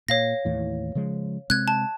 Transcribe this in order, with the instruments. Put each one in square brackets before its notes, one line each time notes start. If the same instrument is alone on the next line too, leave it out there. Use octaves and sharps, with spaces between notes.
[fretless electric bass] A#2 [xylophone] C#5 F5 A#6
[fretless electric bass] D#2 A2 E3
C#3 F3 G#3
[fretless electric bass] C3 G#3 C4 [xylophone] F#6 G#6
[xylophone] A5